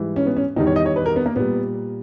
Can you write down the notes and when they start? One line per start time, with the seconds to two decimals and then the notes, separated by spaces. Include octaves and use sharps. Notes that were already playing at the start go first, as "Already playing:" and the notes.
Already playing: G#2 E3 G3
0.16 C#4
0.26 B3
0.36 C#4
0.56 E2 D#3 G3 D#4
0.67 C#5
0.76 D#5
0.86 C#5
0.96 B4
1.06 A#4
1.16 B3
1.26 A#3
1.36 A#2 G3 B3